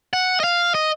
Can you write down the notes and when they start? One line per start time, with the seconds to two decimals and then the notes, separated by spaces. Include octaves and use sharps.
0.13 F#5
0.40 D#5
0.44 F5
0.75 D#5